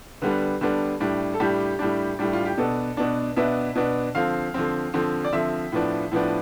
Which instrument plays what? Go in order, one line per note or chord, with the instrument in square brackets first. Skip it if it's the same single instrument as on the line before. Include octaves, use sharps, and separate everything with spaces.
[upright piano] D3 G3 B3 D4 B4
D3 G3 B3 D4
A2 G3 D4
A4
A2 G3 D4 G4
A2 G3 D4
A2 G3 D4
F4
G4
B2 B3 D4 A4
B2 B3 D4
B2 B3 D4 E5
B2 B3 D4
D3 F3 C4 F5
D3 F3 C4
D3 F3 C4
D5
D3 F3 C4 E5
A2 F3 B3 D4
A2 F3 B3 D4